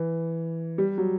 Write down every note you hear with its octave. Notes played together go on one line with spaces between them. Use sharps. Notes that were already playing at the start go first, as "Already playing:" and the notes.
Already playing: E3
G3
F#3